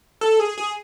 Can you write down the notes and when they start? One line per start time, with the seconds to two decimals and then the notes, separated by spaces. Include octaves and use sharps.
0.21 A4
0.40 G#4
0.58 G#4